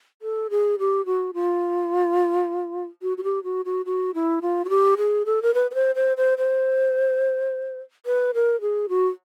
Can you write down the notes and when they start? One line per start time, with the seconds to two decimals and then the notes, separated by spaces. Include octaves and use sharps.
0.22 A4
0.50 G#4
0.79 G4
1.06 F#4
1.34 F4
3.02 F#4
3.18 F#4
3.24 G4
3.44 F#4
3.65 F#4
3.86 F#4
4.14 E4
4.42 F4
4.65 F#4
4.69 G4
4.97 G#4
5.26 A4
5.42 A#4
5.54 B4
5.71 B4
5.75 C5
5.95 C5
6.17 C5
6.38 C5
8.06 B4
8.34 A#4
8.61 G#4
8.89 F#4